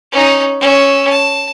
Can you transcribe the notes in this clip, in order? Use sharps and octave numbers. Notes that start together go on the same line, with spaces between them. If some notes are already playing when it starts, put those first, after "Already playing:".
C#4 D#4
C#4 E6
A5